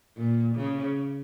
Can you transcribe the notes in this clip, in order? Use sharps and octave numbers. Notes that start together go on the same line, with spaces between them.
A#2
C#3